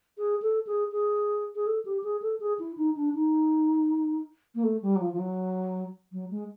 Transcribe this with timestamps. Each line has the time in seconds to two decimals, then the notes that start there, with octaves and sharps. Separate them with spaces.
0.18 G#4
0.42 A4
0.67 G#4
0.92 G#4
1.55 G#4
1.66 A4
1.85 G4
2.04 G#4
2.22 A4
2.40 G#4
2.59 E4
2.77 D#4
2.97 D4
3.15 D#4
4.55 A#3
4.64 A3
4.82 G3
4.96 F#3
5.01 F3
5.13 F3
5.19 F#3
6.12 F#3
6.30 G#3